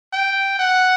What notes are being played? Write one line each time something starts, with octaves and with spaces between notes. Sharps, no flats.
G5
F#5